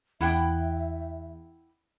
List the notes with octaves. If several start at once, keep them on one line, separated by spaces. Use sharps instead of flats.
E2 E4 E5 F#5 G5